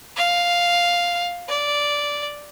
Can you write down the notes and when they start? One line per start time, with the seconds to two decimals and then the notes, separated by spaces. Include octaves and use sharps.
0.16 F5
1.49 D5